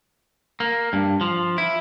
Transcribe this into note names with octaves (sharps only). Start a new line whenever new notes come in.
A#3
G2
F3
E4